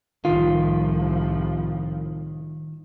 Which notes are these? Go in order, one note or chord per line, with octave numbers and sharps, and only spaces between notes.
C2 A2 D#3 F3 F4